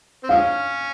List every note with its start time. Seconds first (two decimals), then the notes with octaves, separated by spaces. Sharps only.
0.23 C4
0.29 F3 G#3 C#4 F5